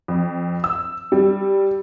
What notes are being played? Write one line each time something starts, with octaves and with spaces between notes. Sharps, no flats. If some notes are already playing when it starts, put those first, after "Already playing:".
F2
E6
G3